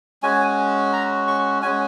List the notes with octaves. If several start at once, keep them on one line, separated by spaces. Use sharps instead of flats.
G#3 C#4 F#4 G#5
A#5
C#6
G#3 C#4 F#4 G#5